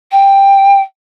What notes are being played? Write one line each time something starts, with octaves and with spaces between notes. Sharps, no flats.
G5